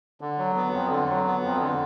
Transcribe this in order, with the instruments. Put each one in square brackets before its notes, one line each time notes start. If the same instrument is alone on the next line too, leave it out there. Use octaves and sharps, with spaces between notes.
[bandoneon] D3
F#3
B3
F2
D3
F#3
B3
F2
D3